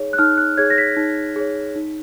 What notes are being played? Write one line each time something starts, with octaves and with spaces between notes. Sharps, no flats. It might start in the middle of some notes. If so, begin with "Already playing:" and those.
Already playing: D#4 G#4 C#5
F#6
D#4 F6
F#6
G#4 C#5 G#6
A#6
B6
D#4
G#4 C#5
D#4